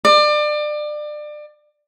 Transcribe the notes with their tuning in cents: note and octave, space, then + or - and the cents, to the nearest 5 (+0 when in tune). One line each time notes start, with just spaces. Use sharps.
D5 +30